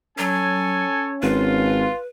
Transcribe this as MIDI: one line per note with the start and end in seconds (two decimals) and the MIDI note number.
0.18 0.84 54
0.18 1.87 61
0.18 1.16 69
0.18 1.16 73
0.18 1.16 80
1.22 1.86 32
1.22 1.97 65
1.22 2.06 71